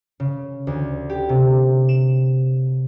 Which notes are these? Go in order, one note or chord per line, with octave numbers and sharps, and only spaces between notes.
C#3
D2
G4
C3
E7